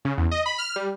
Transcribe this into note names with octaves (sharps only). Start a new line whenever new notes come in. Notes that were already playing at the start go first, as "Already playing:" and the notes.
C#3
E2
D#5
B5
F6
G3